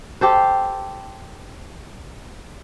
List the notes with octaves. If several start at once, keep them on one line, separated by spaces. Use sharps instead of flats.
G4 A4 C5